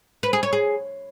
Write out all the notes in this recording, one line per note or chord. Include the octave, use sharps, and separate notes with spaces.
B4
G#4
C#5
G#4